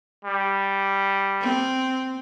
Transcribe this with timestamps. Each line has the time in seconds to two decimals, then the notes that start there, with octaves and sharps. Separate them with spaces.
0.25 G3
1.41 C4